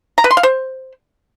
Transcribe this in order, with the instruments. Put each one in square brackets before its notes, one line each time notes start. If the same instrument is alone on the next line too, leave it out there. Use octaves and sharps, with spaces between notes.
[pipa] A#5
B4
C6
F5
C5